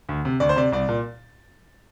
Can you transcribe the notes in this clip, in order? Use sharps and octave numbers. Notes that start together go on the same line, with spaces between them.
D2
C3
D2 D5
C5
C3 D5
C2 D5
A#2